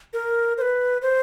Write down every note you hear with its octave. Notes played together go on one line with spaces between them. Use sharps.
A#4
C5
B4
C5